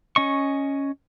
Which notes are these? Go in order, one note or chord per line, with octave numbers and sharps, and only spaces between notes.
C#4 D#5 C#6